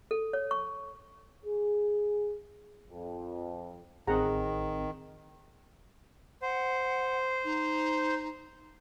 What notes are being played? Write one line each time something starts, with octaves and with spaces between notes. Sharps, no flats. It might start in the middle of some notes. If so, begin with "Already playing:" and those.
A4
C#5
C#6
G#4
F2
A1 D#3 C4 G#4 F#5 A#5
C5 F#5
D#4